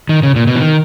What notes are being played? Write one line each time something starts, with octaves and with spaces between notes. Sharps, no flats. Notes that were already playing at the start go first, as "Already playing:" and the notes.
D#3
C#3
A#2
B2
E3
D#3